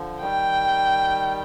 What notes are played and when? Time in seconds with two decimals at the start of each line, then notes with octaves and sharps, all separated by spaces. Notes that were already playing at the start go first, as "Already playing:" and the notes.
Already playing: D3 F3
0.21 D#3 G3 G5